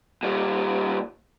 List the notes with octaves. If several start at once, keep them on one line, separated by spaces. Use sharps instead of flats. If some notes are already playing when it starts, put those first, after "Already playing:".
A#2 G3